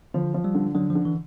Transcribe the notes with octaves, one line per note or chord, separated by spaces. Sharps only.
D3 F3
F3
G3
D3
D3 F#3
F3
D3
E3